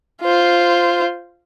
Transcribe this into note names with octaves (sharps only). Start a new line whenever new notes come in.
F4 C5